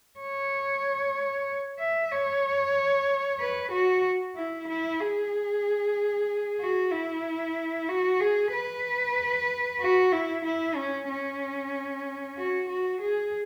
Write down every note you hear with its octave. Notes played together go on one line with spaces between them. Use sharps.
C#5
E5
C#5
B4
F#4
E4
E4
G#4
F#4
E4
F#4
G#4
B4
F#4
E4
E4
C#4
C#4
F#4
F#4
G#4